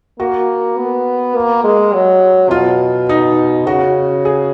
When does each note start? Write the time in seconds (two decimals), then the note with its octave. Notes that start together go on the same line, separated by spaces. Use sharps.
0.20 A#3 F#4
0.77 B3
1.35 A#3
1.64 G#3
1.93 F#3
2.51 B2 F4
3.09 D#4
3.67 C#3 F#4
4.25 G#4